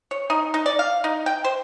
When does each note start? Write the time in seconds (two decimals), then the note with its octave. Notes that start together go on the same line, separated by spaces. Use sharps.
0.11 C#5
0.30 D#4
0.54 D#4
0.66 D5
0.79 F5
1.04 D#4
1.26 G5
1.44 C5